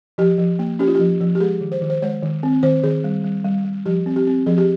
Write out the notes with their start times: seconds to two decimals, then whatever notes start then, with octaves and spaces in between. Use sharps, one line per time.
0.18 F3 G4
0.38 F3
0.59 A#3
0.79 C#4 G4
0.88 F4
0.95 F3 G4
1.21 F3
1.35 G4
1.40 G#3 G#4
1.61 D#3
1.72 C5
1.82 D#3
1.90 C5
2.02 G#3 C#5
2.23 D#3
2.43 C4
2.63 D#3 C5
2.84 D#3 G#4
3.04 G3
3.24 G3
3.44 G3
3.65 G3
3.86 F3 G4
4.06 C4
4.16 G4
4.27 C4
4.46 F3 G#4
4.58 G4